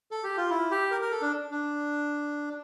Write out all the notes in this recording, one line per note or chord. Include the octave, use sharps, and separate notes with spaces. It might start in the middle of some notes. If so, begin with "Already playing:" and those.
A4
G4
F4
E4
G4
A#4
A#4
A4
D4
D4